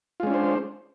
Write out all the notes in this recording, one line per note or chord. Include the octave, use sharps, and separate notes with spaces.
G#3 C#4 D4 F4 C5